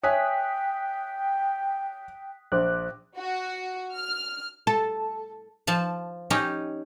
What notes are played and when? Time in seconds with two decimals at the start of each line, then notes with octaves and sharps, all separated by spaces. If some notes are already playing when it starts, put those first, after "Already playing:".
0.03 C#5 E5 G5 G#5 D#6 F#6 B6
2.52 A#1 C5 D6 F#6
3.17 F#4
3.94 F6
4.67 A4
5.67 F3 A5
6.30 C#4 D#4 G4